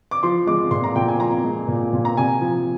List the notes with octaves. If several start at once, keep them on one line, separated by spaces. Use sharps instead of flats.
D6
F3 C6
G#3 D6
A#2 C6
A#5
A#2 G5
G#5
F3 A#5
G#3
A#2
A#2
A#5
C3 G#5
F3